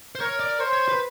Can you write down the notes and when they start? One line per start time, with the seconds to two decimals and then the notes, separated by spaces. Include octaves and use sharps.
0.15 C5
0.21 A#4 C#5
0.40 D5
0.60 C5 C#5
0.73 C#5
0.89 B4